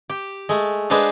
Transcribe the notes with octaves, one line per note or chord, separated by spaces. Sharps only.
G4
G#3 A3
G#3 D4 B4 C5 F5